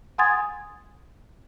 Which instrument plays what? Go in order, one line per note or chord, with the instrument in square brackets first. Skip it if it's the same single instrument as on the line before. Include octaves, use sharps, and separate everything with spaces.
[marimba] F#5 G#5 C6 D#6 G#6 A6